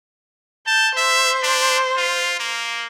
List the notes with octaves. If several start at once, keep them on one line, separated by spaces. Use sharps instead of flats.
A5 G6
C5 E5
D4
F4
A#3